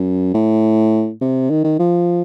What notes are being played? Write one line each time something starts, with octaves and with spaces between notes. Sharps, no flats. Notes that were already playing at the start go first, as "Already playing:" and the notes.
Already playing: F#2
A2
C3
D#3
D#3
F3